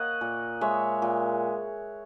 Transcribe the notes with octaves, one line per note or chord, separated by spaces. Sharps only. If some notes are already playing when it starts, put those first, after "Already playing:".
Already playing: A#3 C#5 D#5 F#5
A#2
G#3 C#5 E5
A#2